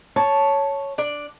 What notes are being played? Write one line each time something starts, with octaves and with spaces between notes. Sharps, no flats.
C#5 A5
D4 D5